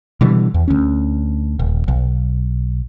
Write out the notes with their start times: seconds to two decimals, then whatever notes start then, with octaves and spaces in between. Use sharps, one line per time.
0.21 B2 D3 E3 G3
0.54 E2
0.68 D2 C#4
1.59 D#1
1.88 B1